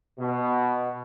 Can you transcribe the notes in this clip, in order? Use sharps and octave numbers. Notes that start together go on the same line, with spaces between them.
B2